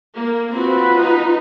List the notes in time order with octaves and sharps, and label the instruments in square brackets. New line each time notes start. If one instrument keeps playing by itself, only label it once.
[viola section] A#3
[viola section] C4 F#4 [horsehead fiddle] F4 B4
[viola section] D#4